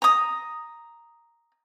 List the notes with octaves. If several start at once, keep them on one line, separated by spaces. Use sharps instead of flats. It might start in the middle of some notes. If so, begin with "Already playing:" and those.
A#5 D#6